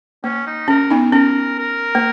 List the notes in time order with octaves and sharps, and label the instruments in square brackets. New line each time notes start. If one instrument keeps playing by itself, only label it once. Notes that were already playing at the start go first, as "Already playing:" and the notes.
[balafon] A#3 [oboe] C#4
[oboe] D#4
[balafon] C#4 [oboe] A#4
[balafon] B3 D#4
[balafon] C#4 [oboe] A#4
[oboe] A#4
[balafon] A#3